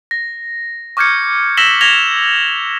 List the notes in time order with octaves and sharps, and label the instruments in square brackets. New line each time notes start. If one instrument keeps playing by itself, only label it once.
[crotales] A#6
C#6 D6 F6 G6 G#6 C#7
E6 A#6 B6 E7 F#7 G7
G#6 A#6 F7 G7